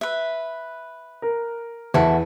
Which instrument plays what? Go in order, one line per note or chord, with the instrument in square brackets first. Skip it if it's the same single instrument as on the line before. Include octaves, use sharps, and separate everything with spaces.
[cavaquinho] B4 E5
[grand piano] A#4
[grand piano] E2 [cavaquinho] E4 F#4 A4